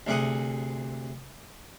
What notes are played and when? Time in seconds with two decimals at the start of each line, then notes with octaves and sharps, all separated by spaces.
0.07 D2 C3 G#4 F#5 D#6